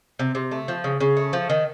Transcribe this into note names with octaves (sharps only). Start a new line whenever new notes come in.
C3
C3
A3
F3
C#3
C#3
A3
F3
D#3